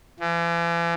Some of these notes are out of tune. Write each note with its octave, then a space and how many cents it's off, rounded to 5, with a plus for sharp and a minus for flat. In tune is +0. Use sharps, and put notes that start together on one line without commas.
E3 +45